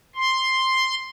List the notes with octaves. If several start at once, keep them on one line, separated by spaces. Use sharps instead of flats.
C6